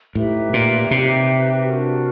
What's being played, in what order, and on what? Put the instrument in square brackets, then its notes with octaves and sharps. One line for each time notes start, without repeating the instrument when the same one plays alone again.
[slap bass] A2 [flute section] D#4 G4 B4 E5
[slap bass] A#2
[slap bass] C3 [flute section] D#4 G4 B4 E5
[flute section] D4 F#4 A#4